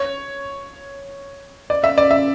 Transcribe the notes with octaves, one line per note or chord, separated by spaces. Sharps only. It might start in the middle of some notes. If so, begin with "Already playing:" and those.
Already playing: C#5
D5
E5
D5
E5